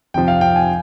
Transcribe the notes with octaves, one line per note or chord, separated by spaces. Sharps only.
F2 C3 F3 G5
F5
G5
G#5